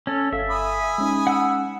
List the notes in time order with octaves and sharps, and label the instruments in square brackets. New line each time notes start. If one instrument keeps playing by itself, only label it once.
[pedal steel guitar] C#4 A4
[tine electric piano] G1 A4 F5 [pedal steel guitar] E5
[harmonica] G#5 B5 D#6
[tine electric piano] G#3 C#4 D#4
[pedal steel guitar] F#5 E6